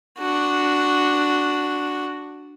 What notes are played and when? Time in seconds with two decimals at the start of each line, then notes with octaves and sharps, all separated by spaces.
0.19 D4 F#4